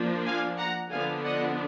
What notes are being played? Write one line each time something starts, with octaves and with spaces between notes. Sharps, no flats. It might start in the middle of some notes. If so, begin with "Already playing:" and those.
Already playing: F3 A#3 D4
F5 G#5
F#5 A#5
D3 F3 B3 D4 F5 G#5
D#5 F#5